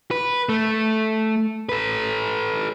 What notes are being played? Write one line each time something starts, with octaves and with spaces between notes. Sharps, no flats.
B4
A3
A4 B4